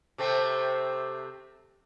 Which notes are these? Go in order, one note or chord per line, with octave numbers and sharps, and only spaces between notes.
C3 A3 C4